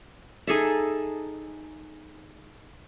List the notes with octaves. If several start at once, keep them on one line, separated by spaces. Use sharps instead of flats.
D#4 G#4 A4 E5